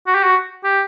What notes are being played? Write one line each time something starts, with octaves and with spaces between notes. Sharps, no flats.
F#4
G4
F#4
G4